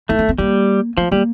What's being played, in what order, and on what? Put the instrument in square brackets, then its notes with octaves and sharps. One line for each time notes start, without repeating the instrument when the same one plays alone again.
[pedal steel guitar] A3 [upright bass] E4
[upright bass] D4
C4
[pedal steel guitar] G3 [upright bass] A#3
[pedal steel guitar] F3 [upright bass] A3
[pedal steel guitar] G3 [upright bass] A#3